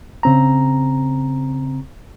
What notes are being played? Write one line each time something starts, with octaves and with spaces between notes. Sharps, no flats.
C#3 C4 A#5